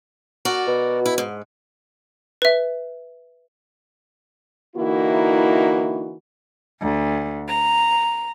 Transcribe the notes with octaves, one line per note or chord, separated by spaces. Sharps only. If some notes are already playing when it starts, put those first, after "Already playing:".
F#4 A#4 D5
B2
E4
G#2
B4 E5
D3 E3 A#3 D#4 E4 F#4
D2
A#5